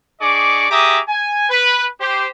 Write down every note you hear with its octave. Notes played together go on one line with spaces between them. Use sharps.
D4 G#4 D5 D#5 C#6 D6
G4 G#4 E5 A#5 D6 D#6
G#5
B4
G4 C5